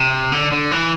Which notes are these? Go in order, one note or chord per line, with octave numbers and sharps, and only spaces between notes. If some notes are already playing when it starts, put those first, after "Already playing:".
Already playing: C3
D3
D3
E3